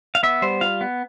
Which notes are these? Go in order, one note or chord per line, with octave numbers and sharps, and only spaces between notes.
F5
B3 E5
G3 C5
F4 F5
B3